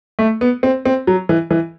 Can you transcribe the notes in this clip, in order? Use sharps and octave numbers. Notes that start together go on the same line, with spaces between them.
A3
B3
C4
C4
F#3
E3
E3